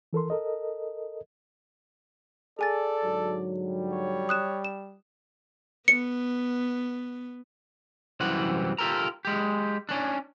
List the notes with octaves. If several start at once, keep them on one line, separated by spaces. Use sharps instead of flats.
E3 A4 A#4 C6
A4 A#4 D#5
G#4 A4 D5 G#5 A6
G#2 D3 F#3
G3
C#5
D#6 F#6 E7
E7
B3 C#7
C2 F#2 E3 C4 F#5
F4 G4 A4 A#4 A#5
G#3 G4
C#4 D4